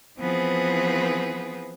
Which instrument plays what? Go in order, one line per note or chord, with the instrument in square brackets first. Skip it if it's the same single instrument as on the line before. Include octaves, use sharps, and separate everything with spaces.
[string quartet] E3 F3 B3 C4 G#4 B4